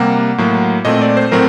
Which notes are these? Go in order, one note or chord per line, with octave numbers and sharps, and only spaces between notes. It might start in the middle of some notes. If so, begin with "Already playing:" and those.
Already playing: C3 G3 A#3 F#5
A2 F#3 A#3
A#2 A3 C4 D#5
D5
C5
A2 F#3 A3 C4 A#4